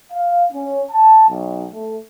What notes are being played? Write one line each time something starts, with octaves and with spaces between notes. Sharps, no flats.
F5
C#4
A5
B1
A3